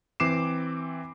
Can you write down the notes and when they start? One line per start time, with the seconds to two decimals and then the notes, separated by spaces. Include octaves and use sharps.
0.20 E3 C4 D6 C7 E7